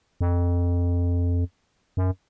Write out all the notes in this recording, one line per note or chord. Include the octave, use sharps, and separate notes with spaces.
F2
F#2